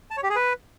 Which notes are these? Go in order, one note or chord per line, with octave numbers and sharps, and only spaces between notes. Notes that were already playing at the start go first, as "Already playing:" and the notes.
A5
C#5
G4
G#4
B4